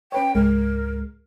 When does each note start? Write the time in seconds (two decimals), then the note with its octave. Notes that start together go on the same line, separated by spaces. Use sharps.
0.12 C#4 B4 C#5 G5
0.35 C#2 G#2 G#3 A#4